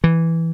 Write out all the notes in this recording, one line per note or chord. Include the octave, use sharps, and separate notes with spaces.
E3